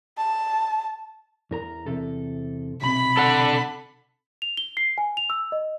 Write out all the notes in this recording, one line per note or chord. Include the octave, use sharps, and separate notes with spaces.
A5
E2 A#4 A#5
E2 C3 A4
B1 C3 B5
A4 F#5
F7
G7
C7
G#5
F7
E6
D#5